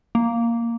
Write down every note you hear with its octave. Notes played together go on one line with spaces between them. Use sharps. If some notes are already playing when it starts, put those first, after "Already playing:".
A#3